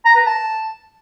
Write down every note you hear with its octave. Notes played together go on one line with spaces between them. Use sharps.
A#5
B4
A5